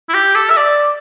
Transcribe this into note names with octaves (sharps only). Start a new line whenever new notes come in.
E4
G4
A4
E5
D5